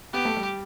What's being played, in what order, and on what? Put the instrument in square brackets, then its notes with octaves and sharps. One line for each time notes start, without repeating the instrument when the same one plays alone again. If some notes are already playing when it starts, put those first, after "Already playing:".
[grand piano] B3 [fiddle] G4
[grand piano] A3
G3